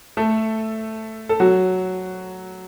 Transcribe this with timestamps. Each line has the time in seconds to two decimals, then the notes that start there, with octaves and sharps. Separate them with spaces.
0.17 A3 A4
1.29 A4
1.40 F#3 F#4